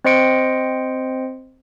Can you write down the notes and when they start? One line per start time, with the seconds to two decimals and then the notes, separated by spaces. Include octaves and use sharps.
0.04 C4 C5 D#5 C6 C#7 D7